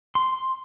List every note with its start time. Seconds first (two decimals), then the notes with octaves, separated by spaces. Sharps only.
0.15 C6